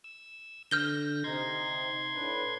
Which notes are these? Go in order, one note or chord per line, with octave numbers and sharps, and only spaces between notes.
E6
D3 F6 G6 A#6 G7
C3 D#4 C6 G#6
A2 D4 B4